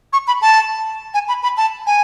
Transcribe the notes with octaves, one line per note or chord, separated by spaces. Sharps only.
C#6
B5
A5
G#5
B5
B5
A5
G#5